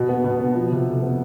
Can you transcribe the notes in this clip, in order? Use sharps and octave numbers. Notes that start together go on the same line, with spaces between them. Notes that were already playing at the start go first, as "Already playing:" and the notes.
Already playing: B2
B3
B2
B3
F3
C3
F2
B3